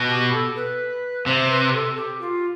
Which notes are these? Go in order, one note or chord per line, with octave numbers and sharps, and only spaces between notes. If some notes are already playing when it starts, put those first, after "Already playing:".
Already playing: B2
G4
A4
B4
C3 C5
B4
A4
G4
F4